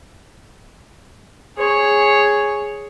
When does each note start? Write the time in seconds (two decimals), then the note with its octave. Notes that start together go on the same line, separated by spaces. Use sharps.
1.57 G#4 C#5